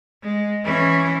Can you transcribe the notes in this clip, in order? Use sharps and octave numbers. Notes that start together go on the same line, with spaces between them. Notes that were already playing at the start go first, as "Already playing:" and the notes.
G#3
E3 C#4